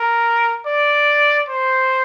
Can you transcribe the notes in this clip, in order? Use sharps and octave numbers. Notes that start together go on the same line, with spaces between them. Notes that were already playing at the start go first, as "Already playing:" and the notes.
Already playing: A#4
D5
C5